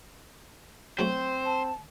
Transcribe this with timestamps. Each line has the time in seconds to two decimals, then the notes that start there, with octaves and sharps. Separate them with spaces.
0.99 F#3 A3 C4 F#4 C5
1.45 A5